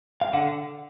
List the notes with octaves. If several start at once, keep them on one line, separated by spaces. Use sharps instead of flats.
F5
D3 F#5